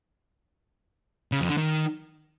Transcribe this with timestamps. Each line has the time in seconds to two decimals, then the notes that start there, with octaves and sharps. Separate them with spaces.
1.32 C#3
1.40 F2
1.49 D3
1.58 D#3